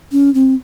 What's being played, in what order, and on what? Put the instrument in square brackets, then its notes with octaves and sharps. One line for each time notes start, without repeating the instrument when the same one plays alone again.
[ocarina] C#4
C4